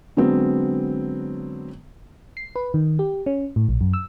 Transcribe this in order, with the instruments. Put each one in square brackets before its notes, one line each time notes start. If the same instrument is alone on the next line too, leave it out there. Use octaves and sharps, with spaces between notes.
[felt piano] D3 F#3 G#3 B3 C4
[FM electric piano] C7
B4
D#3
G4
C#4
A2
A#1
F#2
E6